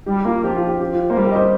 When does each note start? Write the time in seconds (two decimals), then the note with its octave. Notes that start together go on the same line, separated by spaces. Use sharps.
0.06 G3 G4
0.20 G4
0.25 A#3 F4
0.44 F3 G4
0.56 F4
0.68 G4
0.80 G4
0.93 F4
1.10 A#3 C5
1.17 G3 A#4
1.27 G4
1.31 D#5
1.35 C5